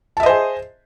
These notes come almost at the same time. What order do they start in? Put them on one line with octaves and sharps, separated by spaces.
A5 E5 D#5 C5 G#4